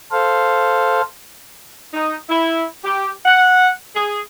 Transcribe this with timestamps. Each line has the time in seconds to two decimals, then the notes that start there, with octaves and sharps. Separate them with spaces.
0.11 A4 C5 F5
1.94 D#4
2.29 E4
2.84 G4
3.26 F#5
3.95 G#4